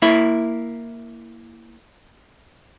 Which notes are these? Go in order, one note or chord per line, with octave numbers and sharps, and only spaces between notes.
A#3 E4 E5